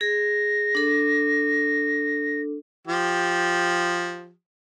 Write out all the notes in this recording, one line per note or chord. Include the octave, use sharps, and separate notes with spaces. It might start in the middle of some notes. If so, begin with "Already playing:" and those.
G#4 A#6
D4 A4
F3 G4